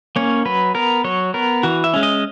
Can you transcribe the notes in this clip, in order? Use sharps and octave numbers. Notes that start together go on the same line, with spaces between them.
A#3 C#4 C#5
F#3 B4
B3 A#4
F#3 C#5
B3 A#4
E3 F#4
E5
G#3 C#4
D#5